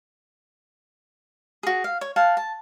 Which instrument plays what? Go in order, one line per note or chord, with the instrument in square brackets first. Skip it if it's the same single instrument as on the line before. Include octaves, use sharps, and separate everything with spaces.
[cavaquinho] F#4 G#4
F5
C#5
F5 F#5 G#5 A5
A5